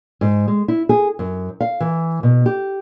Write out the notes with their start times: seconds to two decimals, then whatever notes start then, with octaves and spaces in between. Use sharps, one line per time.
0.21 G#2
0.48 G#3
0.68 E4
0.89 G#4
1.19 F#2
1.60 F5
1.80 E3
2.23 B2
2.46 G4